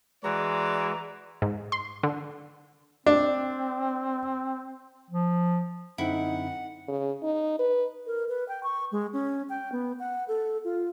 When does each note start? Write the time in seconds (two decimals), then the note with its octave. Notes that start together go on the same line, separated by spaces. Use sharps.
0.24 E3 G#3 F#4 D5 A#5
1.42 G#2
1.72 C6
2.03 D3
3.06 C4 D4
5.11 F3
5.98 F#2 D3 C4 D#4 E4 F#5
6.88 C#3
7.23 D#4
7.59 B4
8.06 A#4
8.29 B4
8.48 G5
8.63 C#6
8.92 G#3
9.13 C#4
9.49 G5
9.72 B3
9.99 F#5
10.28 A4
10.64 F4